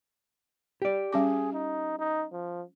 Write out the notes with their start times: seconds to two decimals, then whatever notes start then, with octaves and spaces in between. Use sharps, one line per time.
0.82 G4 D5
1.13 G3 C#4 G#4 D6
1.53 D#4
1.99 D#4
2.32 F3